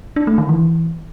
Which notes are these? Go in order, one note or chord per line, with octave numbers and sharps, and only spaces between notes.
D4
A3
D#3
E3